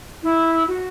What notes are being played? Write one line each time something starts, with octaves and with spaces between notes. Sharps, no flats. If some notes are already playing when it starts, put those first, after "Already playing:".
E4
F#4